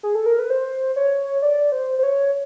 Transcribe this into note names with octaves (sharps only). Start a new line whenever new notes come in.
G#4
A4
A#4
B4
C5
C#5
D5
C5
C5
C#5